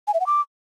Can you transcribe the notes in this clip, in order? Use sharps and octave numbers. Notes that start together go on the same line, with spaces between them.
G#5
E5
F#5
D6